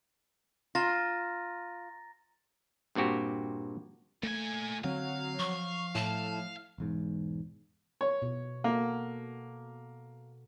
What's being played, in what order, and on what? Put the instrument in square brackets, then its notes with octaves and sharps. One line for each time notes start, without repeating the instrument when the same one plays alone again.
[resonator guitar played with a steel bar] F4 [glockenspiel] A#5 A6 A#6
[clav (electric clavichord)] G2 A#2 C4 F#4 G4
[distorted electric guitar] A#2 G#5 [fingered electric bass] A3
[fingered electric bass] D3 C4 [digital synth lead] F#3 [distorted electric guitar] F5
[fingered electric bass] F3 [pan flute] C#6
[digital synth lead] A2 [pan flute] A5
[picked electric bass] E1 E2 G#2
[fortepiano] C#5
[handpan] B2
[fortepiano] A#3 [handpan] F#4 A4